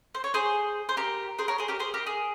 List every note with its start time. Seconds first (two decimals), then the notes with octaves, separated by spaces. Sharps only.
0.15 C5
0.24 C#5
0.34 G#4 C5
0.89 C5
0.97 G4 A#4
1.39 G#4 C5
1.48 A#4 C#5
1.58 G#4 C5
1.68 G4 A#4
1.80 G#4 C5
1.94 G4 A#4
2.07 G#4